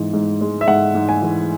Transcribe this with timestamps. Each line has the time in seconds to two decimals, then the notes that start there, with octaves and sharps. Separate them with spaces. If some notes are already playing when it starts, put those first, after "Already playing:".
Already playing: G#2 E3 G#3
0.13 G#2
0.41 G#3
0.61 E5
0.68 G#2 F#5
0.95 G#2
1.09 G#5
1.23 E3